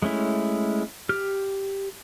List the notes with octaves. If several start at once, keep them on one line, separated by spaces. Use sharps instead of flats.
G#3 A3 C#4 E4
G4 F6